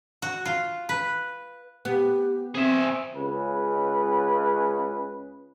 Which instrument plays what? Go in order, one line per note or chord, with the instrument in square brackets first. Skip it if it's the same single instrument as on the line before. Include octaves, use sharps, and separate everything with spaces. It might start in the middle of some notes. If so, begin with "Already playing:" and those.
[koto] F#4
F4
B4
[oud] B3 [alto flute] G4
[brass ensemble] C4 [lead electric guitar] G#4 E5 [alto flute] C5
[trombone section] C#2 C#3 B4